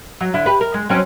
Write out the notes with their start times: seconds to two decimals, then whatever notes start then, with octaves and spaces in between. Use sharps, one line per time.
0.21 F#3
0.34 D3 E4
0.46 G4 B4
0.61 A#4
0.74 G#3
0.89 F#3 C4 C#4